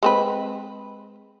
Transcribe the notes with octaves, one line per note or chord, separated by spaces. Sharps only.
G#3 C4 B4